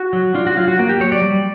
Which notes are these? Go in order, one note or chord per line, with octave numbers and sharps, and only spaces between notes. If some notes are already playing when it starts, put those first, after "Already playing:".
Already playing: F#4
F#3
D4 F4
F#4
F#3 F4
F#4
A#3 F#4
G4
F#3 C#5
D5
G3